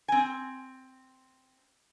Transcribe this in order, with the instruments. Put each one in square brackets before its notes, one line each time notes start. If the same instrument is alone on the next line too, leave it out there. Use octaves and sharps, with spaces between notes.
[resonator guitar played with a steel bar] C4 G#5